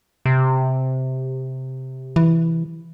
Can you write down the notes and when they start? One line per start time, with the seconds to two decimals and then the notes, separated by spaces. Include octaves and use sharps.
0.26 C3
2.16 E3